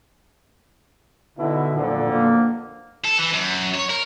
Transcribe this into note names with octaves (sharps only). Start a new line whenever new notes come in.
B2 D3 D#4 E4
B1 F2 A#2 D3
A#3
A4
E3
F#2
C#5
A#4